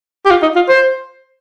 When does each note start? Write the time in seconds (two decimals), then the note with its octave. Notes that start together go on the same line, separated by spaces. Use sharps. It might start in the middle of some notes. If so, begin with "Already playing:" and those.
0.25 G4
0.30 F4
0.42 D#4
0.56 F4
0.69 C5